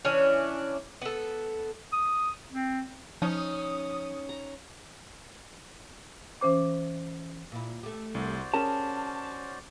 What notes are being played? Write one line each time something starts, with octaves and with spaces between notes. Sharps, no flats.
E3 C#4 D4 C#5
B3 A4
D#6
C4
F3 C#4 D#4 D#6
A#5
E3 C#4 C5 D6
A#2 E4
A3 G4
C2 F#4 C5 D5
C#4 G4 G#4 A#4 A5